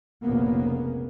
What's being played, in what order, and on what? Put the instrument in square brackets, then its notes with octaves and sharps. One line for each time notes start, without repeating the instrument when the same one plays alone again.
[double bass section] F1 A#1 A#2 C#3 A#3 B3